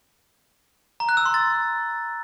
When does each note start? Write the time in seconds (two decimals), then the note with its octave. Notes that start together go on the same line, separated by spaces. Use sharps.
1.00 A#5
1.09 F#6
1.17 E6
1.26 C6
1.34 A6